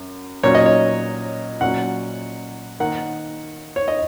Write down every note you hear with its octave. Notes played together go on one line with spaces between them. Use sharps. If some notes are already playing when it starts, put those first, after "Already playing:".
Already playing: F#2
A#2 F#3 C#4 C#5
D#5
C#5
A#2 F#3 C#4 F#5
D#3 A#3 D#4 F#5
C#5
D#5